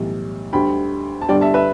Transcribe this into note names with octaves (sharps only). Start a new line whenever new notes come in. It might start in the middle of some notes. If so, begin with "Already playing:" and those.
Already playing: B1 A2 E3 G3
D2 D3 G3 G5 B5
A5
G1 G2 D3 G3 D5 G5
E5 A5
B4 E5